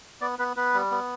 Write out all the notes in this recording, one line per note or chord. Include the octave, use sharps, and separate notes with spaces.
B3 D5
B3 B4
B3 B4
G3
B3